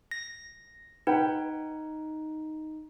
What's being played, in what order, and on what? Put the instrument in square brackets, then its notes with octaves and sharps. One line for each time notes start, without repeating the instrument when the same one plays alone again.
[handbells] A#6
[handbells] D#4 [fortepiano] B4 F#5 G5